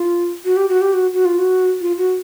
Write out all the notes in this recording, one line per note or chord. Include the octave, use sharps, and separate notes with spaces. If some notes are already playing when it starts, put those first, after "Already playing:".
Already playing: F4
F#4
G4
F#4
G4
F#4
F#4
F4
F#4
F4
F#4